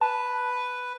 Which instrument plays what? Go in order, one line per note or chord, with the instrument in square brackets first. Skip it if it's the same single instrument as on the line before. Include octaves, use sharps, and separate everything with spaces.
[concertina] B4 [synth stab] A5